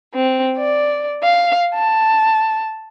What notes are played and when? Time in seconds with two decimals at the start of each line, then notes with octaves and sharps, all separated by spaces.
0.15 C4
0.57 D5
1.24 F5
1.74 A5